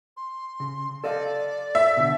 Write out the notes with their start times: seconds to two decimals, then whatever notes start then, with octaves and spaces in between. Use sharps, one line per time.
0.17 C6
0.60 C#3
1.04 A4 D5 D#5 F5
1.75 E5
1.97 B2 D3